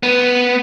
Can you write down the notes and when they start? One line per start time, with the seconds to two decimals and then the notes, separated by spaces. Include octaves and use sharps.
0.03 B3